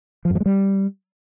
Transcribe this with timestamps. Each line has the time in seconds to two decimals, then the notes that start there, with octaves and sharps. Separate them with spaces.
0.25 F3
0.30 F#2
0.35 F3
0.40 G#3
0.46 G3